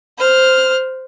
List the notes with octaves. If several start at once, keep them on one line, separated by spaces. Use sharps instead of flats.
C5 F6